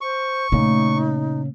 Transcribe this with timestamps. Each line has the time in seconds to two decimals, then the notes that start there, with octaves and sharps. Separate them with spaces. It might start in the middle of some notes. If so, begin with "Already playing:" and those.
0.01 C5 C#6
0.52 A#2 C#3 A3 C#4 D#4